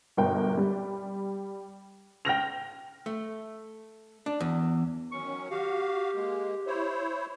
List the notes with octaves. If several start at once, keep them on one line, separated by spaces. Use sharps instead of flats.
G1 B2 A#4 G5
G3
G5 F6 A#6 F7
A3
D4
E2
D#3 F#3 C#4 C#6
F#4 G4 F5
G#3 A#3
E4 C5 C#5